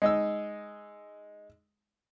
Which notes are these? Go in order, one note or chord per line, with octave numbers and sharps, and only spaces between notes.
G#3 D#4 E6